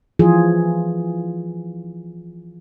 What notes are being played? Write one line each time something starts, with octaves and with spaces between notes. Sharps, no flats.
E3 F3 F4 G#4